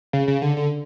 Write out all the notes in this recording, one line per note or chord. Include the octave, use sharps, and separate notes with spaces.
C#3
C#3
D3
D3